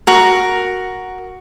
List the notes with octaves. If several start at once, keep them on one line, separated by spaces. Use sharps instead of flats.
F#4 A#4